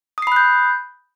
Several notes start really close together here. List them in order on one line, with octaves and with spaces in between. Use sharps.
D#6 C7 B5 F#6 G6